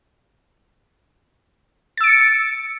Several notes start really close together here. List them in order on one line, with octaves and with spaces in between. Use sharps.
A6 E6 D7 C#7